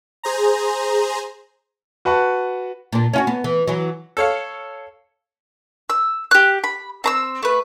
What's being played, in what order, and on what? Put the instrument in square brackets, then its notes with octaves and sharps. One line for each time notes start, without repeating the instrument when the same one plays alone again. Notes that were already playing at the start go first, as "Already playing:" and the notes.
[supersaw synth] G#4 C5 A#5
[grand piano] F#4 B4 F#5 A5 C#6
[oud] A#2 D4
C#4 F4 F#4
B3
E3
E3 F#3
[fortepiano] A4 C#5 F5
[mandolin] E6
G4 F#6
B5
C4 A#5 E6
A3 B4